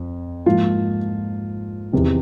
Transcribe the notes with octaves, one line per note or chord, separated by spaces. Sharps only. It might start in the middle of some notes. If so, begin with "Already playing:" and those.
Already playing: F2
G#2 F3 A#3 F4
E2 C3 D#3